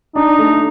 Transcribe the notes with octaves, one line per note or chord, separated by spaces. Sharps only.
D4 D#4
A3